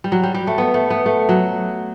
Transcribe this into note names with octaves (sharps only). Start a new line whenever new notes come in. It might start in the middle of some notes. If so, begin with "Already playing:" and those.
G3
F#3
G3
G3
A3
B3
A3
B3
A3
F#3